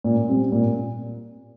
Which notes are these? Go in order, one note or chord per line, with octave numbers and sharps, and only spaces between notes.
A#2
G3 C4
A#2